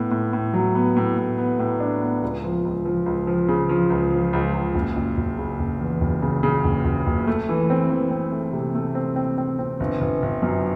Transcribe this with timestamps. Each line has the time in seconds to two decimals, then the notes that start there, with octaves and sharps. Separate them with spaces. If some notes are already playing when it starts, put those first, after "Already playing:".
Already playing: A2 B3
0.11 A2
0.33 A2
0.54 F#3
0.75 B3
0.96 A2
1.18 A2
1.38 B3
1.59 A2
1.80 D4
2.02 B3
2.22 C#2
2.44 F3
2.65 C#2
2.85 F3
3.06 C#2
3.27 F3
3.48 C#3
3.69 F3
3.90 C#2
4.12 F3
4.33 C#2
4.53 C#2
4.75 F#1
4.96 F#1
5.17 F#1
5.38 C#3
5.59 F#1
5.80 E2
6.01 F#1
6.22 C#3
6.43 C#3
6.64 F#1
6.85 F#1
7.07 F#1
7.27 A3
7.49 E3
7.70 C4
7.90 E3
8.11 C4
8.32 A3
8.53 C3
8.75 A3
8.95 C4
9.16 C4
9.38 C4
9.59 C4
9.80 G1
10.01 G1
10.22 G1
10.42 F#2